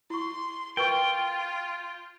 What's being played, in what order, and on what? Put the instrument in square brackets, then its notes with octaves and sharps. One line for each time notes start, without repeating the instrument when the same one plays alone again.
[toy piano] E4 C#6 [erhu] C6
[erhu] F4 [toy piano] A#4 B4 C#6 [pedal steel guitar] G5